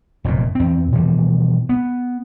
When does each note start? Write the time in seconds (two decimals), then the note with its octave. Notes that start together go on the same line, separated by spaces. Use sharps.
0.24 F1 F#2 A#2
0.55 E2 C4
0.92 B2 E3 F3 G3
1.69 B3